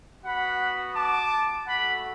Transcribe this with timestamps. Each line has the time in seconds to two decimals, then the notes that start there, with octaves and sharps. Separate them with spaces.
0.24 B3 F#4 F#5 B5
0.95 A5 D6
1.67 A3 F#4 F#5 B5